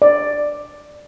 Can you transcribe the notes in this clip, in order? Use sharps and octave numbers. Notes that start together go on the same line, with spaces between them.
D5